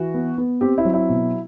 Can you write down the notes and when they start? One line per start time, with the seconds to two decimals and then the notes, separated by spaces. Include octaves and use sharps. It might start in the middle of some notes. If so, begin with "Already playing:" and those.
Already playing: E3 F#4
0.14 B3
0.38 B3
0.61 C4 G4
0.78 E4
0.85 F#3
0.94 E4
1.09 B2